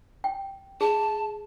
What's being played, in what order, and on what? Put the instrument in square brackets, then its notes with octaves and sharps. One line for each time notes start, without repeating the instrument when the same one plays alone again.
[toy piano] G5
[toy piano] G#4 [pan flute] A5